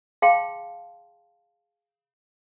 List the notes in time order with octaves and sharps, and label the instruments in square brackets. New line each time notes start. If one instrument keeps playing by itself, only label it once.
[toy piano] G#4 F5 G5 A5 C6